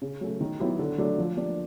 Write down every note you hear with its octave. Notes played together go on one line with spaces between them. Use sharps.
C#3
F#3 A3 C#4
D#3
F#3 B3 E4 G4
D3
F#3 A3 D4
F3
A#3 D4 G4